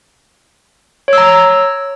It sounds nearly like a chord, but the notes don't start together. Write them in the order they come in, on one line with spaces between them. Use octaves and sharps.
C#5 E6 A#5